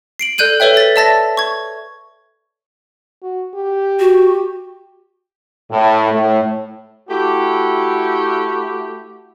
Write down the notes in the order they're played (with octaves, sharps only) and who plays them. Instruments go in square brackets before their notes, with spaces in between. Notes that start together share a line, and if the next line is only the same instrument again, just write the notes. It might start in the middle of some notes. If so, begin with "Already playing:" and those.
[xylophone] C7 D7 F#7
A4 D5 F#6 G6 D#7 F#7
A4 B4 C#5 E5 G5
A6 B6
D5 E5 A5 E6 A6 A#6
C#6 G#6
[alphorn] F#4
G4
[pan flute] F#4
[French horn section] A2
A2
[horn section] A3 E4 F#4 G4